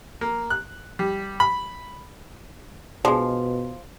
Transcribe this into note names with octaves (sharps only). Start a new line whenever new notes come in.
A#3
F#6
G3
B5
B2 F3 G#3 D4